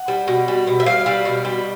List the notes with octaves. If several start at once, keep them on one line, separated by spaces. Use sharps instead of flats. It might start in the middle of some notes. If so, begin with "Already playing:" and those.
Already playing: F#5
G3
B2
G3
B2
E5
G3 F5
G3
B2
G3